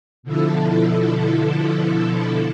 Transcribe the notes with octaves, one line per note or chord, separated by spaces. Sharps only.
B2 D3 F3 E4 A4